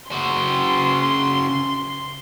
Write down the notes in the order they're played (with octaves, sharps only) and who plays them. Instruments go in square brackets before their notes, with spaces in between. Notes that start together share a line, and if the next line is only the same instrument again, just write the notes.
[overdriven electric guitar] C#3 F#4 [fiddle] C6